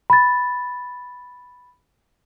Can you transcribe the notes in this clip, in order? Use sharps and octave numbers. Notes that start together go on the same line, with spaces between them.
B5 A6